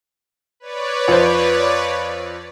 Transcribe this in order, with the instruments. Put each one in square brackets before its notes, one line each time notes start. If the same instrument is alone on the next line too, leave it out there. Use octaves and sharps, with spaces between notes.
[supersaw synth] B4 C#5 D5
[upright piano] F2 C5